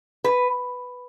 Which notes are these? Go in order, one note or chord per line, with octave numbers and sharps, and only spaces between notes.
B4